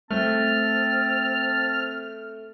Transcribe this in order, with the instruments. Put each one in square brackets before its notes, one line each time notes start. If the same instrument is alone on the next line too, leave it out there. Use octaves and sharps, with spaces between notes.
[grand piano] A3 [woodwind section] C4 [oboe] A5 [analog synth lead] F6